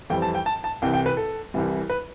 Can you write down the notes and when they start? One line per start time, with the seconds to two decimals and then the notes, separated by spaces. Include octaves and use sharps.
0.10 F2 E3 G3 C4 G5
0.22 A5
0.35 G5
0.46 A5
0.64 A5
0.82 C2 C3 E3 G5
0.93 G5
1.06 B4
1.17 A4
1.54 C2 C3 E3 G3
1.90 B4